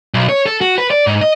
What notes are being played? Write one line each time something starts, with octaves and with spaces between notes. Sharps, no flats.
B1
C#5
A4
F#4
B4
D5
G#2
D#5